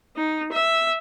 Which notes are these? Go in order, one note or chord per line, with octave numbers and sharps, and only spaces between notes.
D#4
E5